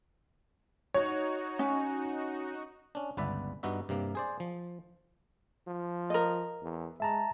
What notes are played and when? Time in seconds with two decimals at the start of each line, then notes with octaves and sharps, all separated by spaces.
0.94 D#4 F#4 C#5
1.59 C#4
2.95 C#4 D4
3.17 G1 C#2 B3 B4 D5 E5
3.63 G2 B3 D#4 F#4 E5
3.89 G2 C3 A#3
4.15 G#4 C5 D5
4.40 F3
5.68 F3
6.10 A#4 D#5
6.62 E2
7.00 G#3 E5 A5 A#5